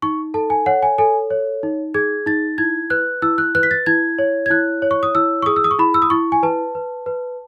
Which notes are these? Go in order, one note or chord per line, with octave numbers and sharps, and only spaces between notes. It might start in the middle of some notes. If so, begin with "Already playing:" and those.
D#4 C#6
A4 A5
G#5
C#5 F#5
G#5
A4 G#5
C#5
D#4
G#4 G#6
D#4 A6
E4 G#6
B4 F#6
E4 E6
F#6
B4 F#6
B6
A6
E4 G#6
C#5
G#6
E4 F#6
C#5
C#6
D#6
E4 E6
C#6
G#4 D#6
E6
D#6
C#6
E4 B5
E6
D#6
E4 C#6
G#5
B4 A5
B4
B4